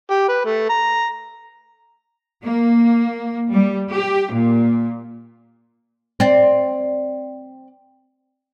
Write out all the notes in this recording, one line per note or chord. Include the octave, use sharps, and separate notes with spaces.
G4
B4
A3
A#5
A#3
G3
G4
A#2
C4 D5